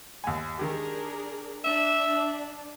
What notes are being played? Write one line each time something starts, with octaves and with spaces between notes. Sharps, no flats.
D#2 G#5
D#3 D4 G4 G#4 A#4
D4 E5